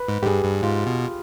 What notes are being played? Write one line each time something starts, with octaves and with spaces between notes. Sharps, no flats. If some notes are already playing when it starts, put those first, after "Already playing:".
Already playing: B4
G#2
G#2 G4
G2 G#4
G2
G#2 F4
B2